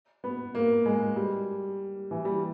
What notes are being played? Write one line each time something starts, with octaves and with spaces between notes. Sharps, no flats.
B3
A#3
G#3
G3
E3
G3